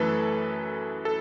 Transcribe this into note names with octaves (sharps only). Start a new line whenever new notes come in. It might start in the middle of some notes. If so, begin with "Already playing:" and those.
Already playing: F#2 E3 A3 A4 B4
A4